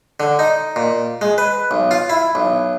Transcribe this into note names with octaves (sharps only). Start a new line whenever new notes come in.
D3
D#4
A#2
G#3
B4
B1
F4
E4
B1